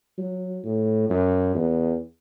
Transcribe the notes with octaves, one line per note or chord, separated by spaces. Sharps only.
F#3
A2
F#2
E2